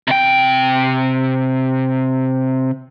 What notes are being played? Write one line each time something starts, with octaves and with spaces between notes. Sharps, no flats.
C3 G5